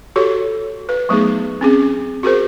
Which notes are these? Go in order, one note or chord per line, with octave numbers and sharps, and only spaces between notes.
F#4 G4 A4 C#5
B4
F#3 A3 B3 D#4 G#4
C4 C#4 G#4
F#4 G#4 A#4 C5